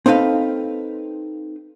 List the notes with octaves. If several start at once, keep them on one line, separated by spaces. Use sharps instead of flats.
C4 D#4 A4 B4 F5